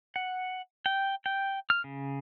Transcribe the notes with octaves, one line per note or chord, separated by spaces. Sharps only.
F#5
G5
G5
F6
C#3